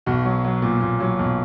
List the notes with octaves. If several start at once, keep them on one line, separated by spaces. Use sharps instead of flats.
B1 F#4
F#3
F#3
A#2
A#2
F#3
B1